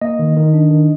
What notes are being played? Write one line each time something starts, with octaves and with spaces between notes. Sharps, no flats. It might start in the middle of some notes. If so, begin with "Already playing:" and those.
A#3 D#5
D#3
D#3
D4
D#3